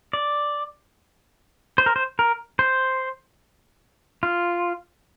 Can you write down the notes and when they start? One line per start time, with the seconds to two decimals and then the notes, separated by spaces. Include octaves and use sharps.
0.13 D5
1.78 C5
1.86 A#4
1.96 C5
2.19 A#4
2.59 C5
4.23 F4